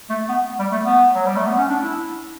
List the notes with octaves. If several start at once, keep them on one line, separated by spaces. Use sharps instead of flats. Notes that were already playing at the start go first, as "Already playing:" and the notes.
A3
B3
G3
A3
B3
F#3
G3
A3
B3
C#4
D4
E4